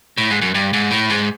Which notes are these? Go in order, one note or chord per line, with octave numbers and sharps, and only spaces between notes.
A2
G#2
F#2
G2
G#2
A2
G#2